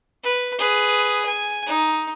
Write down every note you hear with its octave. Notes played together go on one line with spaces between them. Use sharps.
B4
G#4 B4
G#5
D#4